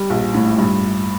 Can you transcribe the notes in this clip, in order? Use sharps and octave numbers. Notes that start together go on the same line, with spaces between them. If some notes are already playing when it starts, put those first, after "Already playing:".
Already playing: G3
A#1
A2
G2